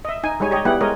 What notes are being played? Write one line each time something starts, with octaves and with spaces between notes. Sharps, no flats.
D#5 E5
D#4 G#5
G3 G#3 D#4 C#5 G#5
G4 C#5 D#5
G3 B3 E4 G4 G#4 F#5
G#3 A#4 C#5 D#5